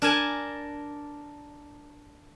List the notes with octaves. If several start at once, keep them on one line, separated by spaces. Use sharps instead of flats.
D4 A#4 G#5 A5